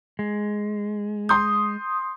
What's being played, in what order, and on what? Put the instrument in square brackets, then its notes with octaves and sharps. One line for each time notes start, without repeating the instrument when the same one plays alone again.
[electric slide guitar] G#3
[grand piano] C6 G6 [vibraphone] D#6